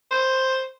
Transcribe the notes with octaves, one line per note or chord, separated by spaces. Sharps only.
C5